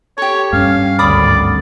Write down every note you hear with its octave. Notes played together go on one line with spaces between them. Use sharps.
G4 A4 C#5
G2 C#4 F5
G#1 D2 D5 B5 D6 D#6